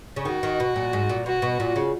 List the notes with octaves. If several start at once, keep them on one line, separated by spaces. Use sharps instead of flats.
C#3
D#3 F#4
D#3
B2
A#2
G#2
A#2
B2 F#4
B2
A#2
C#3